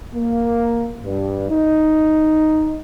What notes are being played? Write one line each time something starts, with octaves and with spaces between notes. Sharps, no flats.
A#3
G2
D#4